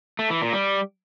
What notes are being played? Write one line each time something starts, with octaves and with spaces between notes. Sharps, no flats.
A3
E3
A#2
G3